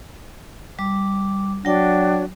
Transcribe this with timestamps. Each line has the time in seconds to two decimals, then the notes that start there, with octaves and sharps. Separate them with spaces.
0.79 G3 D6
1.65 F#3 D4 F#4 C#5 G5